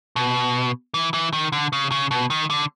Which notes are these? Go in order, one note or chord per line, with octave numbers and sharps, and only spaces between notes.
B2
E3
E3
D#3
D3
C#3
C#3
B2
D#3
D3